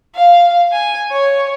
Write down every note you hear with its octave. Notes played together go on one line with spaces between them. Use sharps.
F5
G#5
C#5